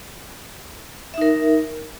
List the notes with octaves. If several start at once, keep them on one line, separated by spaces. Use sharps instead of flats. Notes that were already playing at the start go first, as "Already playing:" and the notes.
D#4 A#4 E5